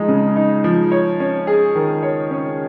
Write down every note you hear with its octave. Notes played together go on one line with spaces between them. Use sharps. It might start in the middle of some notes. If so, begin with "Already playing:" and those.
Already playing: F3 G#3 D#4
C#3
D#4
F3
C#5
C#4
G#4
D#3
C#5
C#4